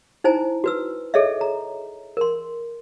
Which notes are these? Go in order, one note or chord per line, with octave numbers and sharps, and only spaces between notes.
D#4 E4 C5 G#5 A#5
F#4 B4 E6
G#4 A4 C#5 D#5 E5
A#5
A#4 C6